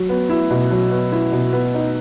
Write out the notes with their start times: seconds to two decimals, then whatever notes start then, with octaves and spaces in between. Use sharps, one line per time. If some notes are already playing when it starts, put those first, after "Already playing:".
Already playing: F#3
0.09 B3
0.30 E4
0.50 B2
0.71 F#3
0.92 B3
1.12 E4
1.32 B2
1.53 B3
1.74 D#4